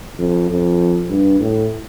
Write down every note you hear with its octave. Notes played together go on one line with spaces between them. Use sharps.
F2
F2
G2
A2